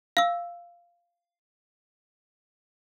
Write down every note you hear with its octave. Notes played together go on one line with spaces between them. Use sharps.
F5 E6